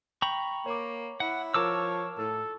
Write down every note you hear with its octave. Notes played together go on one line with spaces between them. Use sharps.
G5 A#5 B5 C#6
A#3 C#5 D6
E4 F#5
F3 A#4 C#5 A5 D6 E6 F6
A2 A4